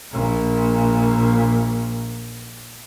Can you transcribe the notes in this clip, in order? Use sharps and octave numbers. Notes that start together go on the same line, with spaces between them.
A#1 A#2